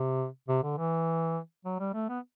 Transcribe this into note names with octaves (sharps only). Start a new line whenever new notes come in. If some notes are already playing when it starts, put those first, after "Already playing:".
Already playing: C3
C3
D3
E3
F#3
G3
A3
B3